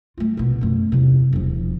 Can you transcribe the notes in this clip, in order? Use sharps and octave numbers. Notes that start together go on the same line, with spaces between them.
A3 F4
C2 B2
F#2 A3
E2 C3
E1 F3